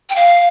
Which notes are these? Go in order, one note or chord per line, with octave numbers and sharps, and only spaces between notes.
G5
F5